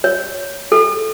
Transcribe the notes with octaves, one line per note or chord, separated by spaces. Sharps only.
C#5
A4